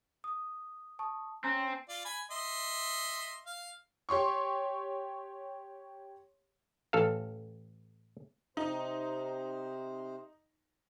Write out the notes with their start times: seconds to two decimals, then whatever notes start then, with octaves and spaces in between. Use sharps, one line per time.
0.24 D#6
0.99 A5 C#6 D#6
1.44 C4 C#4 G#5 A#5
1.89 F4 D5
2.05 G#5 B5
2.31 D#5 E5 C6
3.46 F5
4.09 G4 C#5 C6 C#6
6.93 A1 A4 F5
8.57 C3 D#4 C5